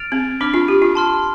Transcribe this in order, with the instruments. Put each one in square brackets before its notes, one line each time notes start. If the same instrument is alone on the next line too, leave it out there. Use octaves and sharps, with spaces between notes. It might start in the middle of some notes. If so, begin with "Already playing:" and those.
Already playing: [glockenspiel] F6 A6 D7 F7
[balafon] C4
[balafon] D4 [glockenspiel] B5 D6 F6
[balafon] F4
G4
F4
[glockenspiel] A5 C6 F6